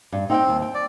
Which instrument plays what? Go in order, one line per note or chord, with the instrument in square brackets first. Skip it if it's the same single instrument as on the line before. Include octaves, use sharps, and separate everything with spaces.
[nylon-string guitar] G2
[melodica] C4 [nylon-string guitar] D#4 F#5 G5
[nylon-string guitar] D#2
G5
[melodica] D5